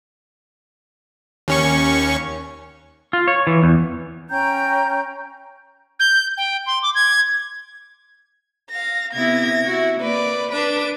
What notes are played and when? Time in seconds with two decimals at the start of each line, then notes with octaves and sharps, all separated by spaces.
1.48 D#2 C#4 C#6
3.13 F4
3.28 C#5
3.47 E3
3.63 E2
4.30 C#4 G5 A#5 G6
6.00 G6
6.37 G5
6.66 C6
6.83 D6
6.95 G#6
8.70 F5 A#6
9.13 C3 B3 E4 G#6 A#6
9.65 E4 F#4
10.00 A#3 B4 D5
10.52 D4 B4 D7